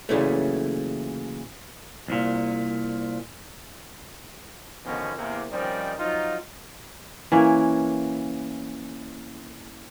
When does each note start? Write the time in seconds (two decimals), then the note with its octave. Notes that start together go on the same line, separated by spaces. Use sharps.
0.09 A#2 C#3 E3 F#3 A3
2.08 C2 A#2
4.84 B2 D3 D#3 F3 B3 C#4
5.16 E2 C3 A#3
5.50 D#3 F3 G3 C4 C#4 D#4
5.97 F3 F#3 D#4 F4
7.32 E3 A#3 C#4